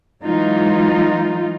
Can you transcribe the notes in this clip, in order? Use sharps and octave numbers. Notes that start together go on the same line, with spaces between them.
E3 F#3 G#3 D#4 F4